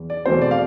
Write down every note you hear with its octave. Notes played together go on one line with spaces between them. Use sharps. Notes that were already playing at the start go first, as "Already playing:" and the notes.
Already playing: E2
D5
E2 B2 A3 C4 C5
D5
F5